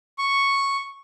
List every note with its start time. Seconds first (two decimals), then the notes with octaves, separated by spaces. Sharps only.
0.18 C#6